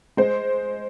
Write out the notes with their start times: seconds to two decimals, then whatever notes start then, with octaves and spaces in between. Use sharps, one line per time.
0.17 G#3 C5